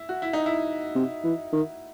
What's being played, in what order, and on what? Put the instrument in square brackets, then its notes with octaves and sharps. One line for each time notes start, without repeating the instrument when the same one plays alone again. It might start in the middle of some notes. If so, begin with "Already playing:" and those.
Already playing: [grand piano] E4
F#4
E4
D#4
E4
[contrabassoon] C3
E3
D#3